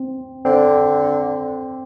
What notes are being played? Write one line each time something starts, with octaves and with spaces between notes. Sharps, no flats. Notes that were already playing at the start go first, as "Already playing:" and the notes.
Already playing: C4
D3 C4